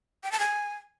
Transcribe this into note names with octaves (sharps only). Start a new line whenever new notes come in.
G5
A5
G#5